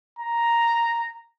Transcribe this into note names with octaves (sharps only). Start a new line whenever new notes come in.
A#5